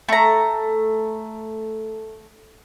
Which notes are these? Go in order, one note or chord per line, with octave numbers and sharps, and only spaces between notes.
A3 A#5